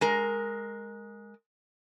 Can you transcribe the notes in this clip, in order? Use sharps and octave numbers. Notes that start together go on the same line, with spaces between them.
G#3 A#4